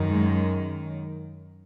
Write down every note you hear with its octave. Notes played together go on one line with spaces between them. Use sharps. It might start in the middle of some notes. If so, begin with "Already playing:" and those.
Already playing: F#2 D#3
G#3